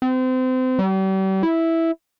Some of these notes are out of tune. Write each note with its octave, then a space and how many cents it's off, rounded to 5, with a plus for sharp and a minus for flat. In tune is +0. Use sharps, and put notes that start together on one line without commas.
C4 -30
G3 -40
E4 -5